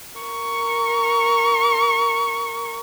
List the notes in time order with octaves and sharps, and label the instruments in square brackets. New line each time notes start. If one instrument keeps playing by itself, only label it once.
[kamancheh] A#4 C#6